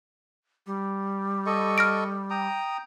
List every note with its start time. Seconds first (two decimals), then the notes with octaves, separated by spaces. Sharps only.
0.66 G3
1.46 A4 D#5 C#6
1.78 F6 A#6 D7
2.30 G5 A#5 D#6